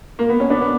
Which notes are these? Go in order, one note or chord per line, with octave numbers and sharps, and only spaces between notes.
A#3
B3
C#4
B3 D4
B3